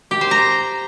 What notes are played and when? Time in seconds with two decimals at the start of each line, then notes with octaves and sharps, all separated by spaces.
0.11 G4
0.21 C5
0.31 A#5